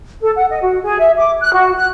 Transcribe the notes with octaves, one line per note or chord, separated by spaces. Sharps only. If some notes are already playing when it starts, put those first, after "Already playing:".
A4
F#5
D#5
F#4
G#4
E5
D6
F#6
F#4
F#6